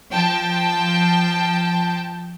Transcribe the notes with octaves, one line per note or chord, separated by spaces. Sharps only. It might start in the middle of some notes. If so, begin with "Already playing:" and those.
F3 G5 A5